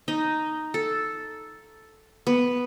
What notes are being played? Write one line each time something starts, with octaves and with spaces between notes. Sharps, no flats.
D#4
A4
B3